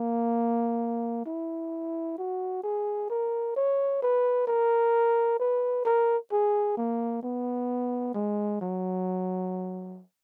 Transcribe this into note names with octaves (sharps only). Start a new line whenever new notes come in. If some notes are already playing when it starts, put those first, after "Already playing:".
Already playing: A#3
E4
F#4
G#4
A#4
C#5
B4
A#4
B4
A#4
G#4
A#3
B3
G#3
F#3